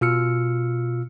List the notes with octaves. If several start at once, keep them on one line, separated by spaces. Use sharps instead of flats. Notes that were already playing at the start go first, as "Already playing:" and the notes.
B2 F4 E6 F6 C#7